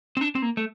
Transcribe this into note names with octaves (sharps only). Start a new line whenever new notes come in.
C4
D4
C4
A#3
A3